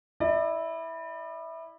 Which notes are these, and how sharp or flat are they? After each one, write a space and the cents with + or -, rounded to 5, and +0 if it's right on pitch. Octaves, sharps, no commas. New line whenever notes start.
E4 -10 D5 +35